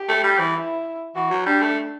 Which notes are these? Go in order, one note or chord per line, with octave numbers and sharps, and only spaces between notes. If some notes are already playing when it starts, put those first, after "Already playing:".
Already playing: G4
A3
G3
E3
E4
E3 F#4
F#3
G3 D4
A3